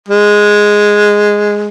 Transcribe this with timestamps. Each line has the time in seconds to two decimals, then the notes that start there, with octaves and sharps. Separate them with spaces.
0.08 G#3